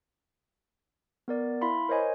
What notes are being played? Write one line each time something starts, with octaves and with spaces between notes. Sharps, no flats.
B3 A#4 D5
E4 F5 B5 C6
A#4 C5 C#5 D#5 G#5